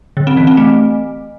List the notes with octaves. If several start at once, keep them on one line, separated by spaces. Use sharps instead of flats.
D3
C4
E3
C4
A3